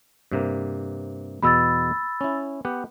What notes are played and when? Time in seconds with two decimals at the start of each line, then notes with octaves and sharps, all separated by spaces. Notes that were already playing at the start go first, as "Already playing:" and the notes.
0.32 G2 C3 A#3
1.42 E2 B2 B3 B5 E6 A6
2.21 C#4 E4
2.65 B3 G4 F#5